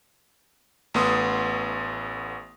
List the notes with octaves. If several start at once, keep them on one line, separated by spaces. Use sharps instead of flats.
A1 A3 B3 C6 D#6 E6